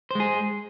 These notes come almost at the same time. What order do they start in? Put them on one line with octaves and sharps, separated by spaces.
C5 G#3 G#4